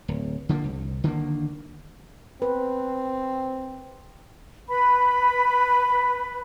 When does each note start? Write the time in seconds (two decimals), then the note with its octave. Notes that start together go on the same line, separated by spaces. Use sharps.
0.08 D1
0.49 D3 F3 A3 A#3
0.64 C2
1.04 D3 D#3 G#3 A#3
2.42 C4 B4
4.68 B4 B5